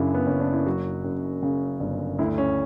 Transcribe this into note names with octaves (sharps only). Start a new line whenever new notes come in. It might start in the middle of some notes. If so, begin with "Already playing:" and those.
Already playing: F#2 C#3 D4 E4
B3
F#1 C#4
D4
E4
F#3 F#4
F#2
C#3
G1
D2 E4
C#4